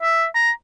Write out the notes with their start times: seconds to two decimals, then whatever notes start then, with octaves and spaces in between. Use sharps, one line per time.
0.02 E5
0.35 A#5